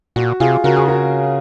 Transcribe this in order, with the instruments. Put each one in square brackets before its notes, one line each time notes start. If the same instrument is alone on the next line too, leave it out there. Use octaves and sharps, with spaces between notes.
[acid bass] A#2 [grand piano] F#4
[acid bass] C3 [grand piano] F4 G#4
[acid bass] C#3 [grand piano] F#4 A#4
[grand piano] G#4
F#4 A#4